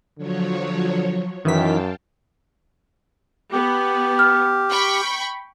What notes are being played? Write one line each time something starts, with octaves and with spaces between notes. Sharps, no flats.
D3 F3 F#3 C#5
F#2 D#3 E3 F5 G5 A5 B6
B3 G4
F6
G5 B5 C#6